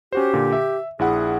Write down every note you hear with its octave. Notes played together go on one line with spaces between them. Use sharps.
C#4 F#4 G4 C5
A#2 D3
E5
A#1 E4 G#4 F#5